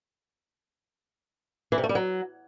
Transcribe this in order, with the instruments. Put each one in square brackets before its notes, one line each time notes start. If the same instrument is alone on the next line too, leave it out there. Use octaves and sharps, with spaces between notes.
[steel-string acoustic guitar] E3
C3
A3
G3
F#3